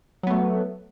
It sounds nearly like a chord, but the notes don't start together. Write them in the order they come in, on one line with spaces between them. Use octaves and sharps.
F#3 B3 A3